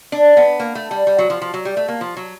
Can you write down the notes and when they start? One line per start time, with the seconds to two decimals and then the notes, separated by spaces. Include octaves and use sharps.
0.12 D4
0.37 B3
0.60 A#3
0.75 A3
0.91 G3
1.07 G3
1.18 F#3
1.30 F3
1.41 F3
1.54 F#3
1.65 G3
1.77 A3
1.88 A#3
2.01 F3
2.17 F#3